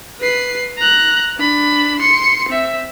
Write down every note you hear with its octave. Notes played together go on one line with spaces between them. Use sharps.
B4 C7
A#5 F#6
D4 B5
C6 C#7
C4 E5